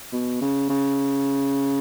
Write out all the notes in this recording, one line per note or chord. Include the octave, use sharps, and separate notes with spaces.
B2
C#3
C#3